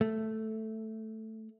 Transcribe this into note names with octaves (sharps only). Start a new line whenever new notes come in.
A3